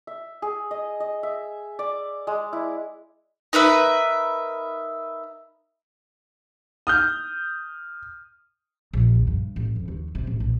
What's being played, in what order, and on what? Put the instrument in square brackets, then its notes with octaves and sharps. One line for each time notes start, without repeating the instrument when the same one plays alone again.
[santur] E5
G#4
D#5
D#5
E5
D5
G#3
E4
[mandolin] D#4 A#4 B4 E5
[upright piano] D#6 F6 G6
[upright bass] A#1
D#2
G2
A1
F2
D#2
C3
A1
A#1